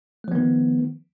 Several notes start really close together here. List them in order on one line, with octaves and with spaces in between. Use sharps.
A3 F3 B3 D#3